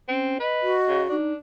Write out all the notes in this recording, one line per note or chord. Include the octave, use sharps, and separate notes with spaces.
C4 C#4
B4 D#5
F#4
C#3
D4 D#4